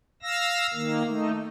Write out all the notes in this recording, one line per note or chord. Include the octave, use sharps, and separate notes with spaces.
F5 E6 A#6
D#3 A#3
A3 D#4